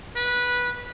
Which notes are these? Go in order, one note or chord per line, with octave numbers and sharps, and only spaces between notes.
B4